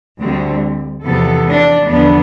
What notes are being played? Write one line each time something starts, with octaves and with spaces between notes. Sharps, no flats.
D2 D3 G3 C4
E2 C3 F3 B3 A4
D4
E2 D3 F3 B3 D4